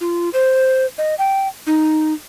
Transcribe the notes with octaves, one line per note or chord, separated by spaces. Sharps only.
F4
C5
D#5
G5
D#4